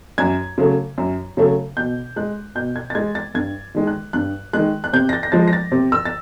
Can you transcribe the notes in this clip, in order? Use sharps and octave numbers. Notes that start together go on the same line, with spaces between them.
F#2 G#6
C#3 F#3 A3
F#2
C#3 F#3 A3
B2 G6
G#3 F#6
B2 G6
G#6
A6
G#3 G#6
A6
G2 G#6
D#3 G#3
F#6
G2 F#6
D#3 G#3 F#6
F#6
C3 G6
A#6
A6
A#6
F3 G#3 A6
A#6
A6
C3
E6
A6